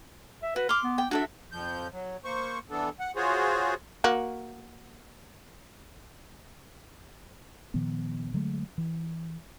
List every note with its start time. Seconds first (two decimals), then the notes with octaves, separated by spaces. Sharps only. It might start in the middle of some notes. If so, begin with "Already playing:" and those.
0.43 E5
0.56 F#4 B4
0.69 C6 D6 F6
0.84 B3
0.98 G5
1.11 D4 F#4 A4 E5
1.52 F2 F3 G6
1.92 F#3
2.25 A#3 C5 C#6
2.70 E3 B3 D4 A4
3.00 F#5
3.16 F4 F#4 G#4 C5 C#5
4.04 A#3 F#4
7.74 A#2 D#3 F3 B3
8.34 D3 F#3 G#3 A3
8.78 E3